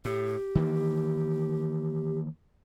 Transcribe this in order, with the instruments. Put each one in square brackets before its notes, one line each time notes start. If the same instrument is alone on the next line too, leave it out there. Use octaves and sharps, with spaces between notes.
[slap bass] A2 [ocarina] G4
[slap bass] D#3 E3 A#3